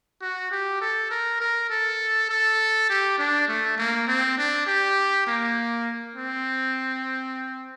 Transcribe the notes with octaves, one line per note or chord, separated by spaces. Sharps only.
F#4
G4
A4
A#4
A#4
A4
A4
G4
D4
A3
A#3
C4
D4
G4
A#3
C4